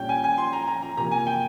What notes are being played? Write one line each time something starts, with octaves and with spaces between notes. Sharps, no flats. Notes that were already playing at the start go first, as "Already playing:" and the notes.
Already playing: A#2 G3 C#4 G5
G#5
G#5
C6
A#5
A#5
A#5
C3 F3 A#3 A#5
G#5
G5